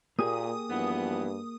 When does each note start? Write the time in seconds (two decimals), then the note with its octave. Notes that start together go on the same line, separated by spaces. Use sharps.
0.19 A#2 A#3 G4 G#4 D#6
0.70 G2 E3 F3 B3